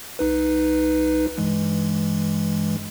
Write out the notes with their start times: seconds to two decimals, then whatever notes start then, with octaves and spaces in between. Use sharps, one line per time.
0.19 C2 D#4 B4
1.38 G2 E3 G#3